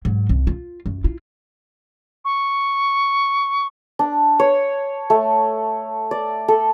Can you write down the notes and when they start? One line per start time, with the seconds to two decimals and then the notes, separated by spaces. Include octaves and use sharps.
0.05 G#2 F#3
0.29 C2
0.47 F4
0.86 F#2
1.04 E4 F4
2.25 C#6
3.99 D4
4.39 C#5
5.10 A3
6.11 D5
6.48 A4